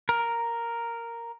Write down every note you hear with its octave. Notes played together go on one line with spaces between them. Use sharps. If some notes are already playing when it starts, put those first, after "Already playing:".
A#4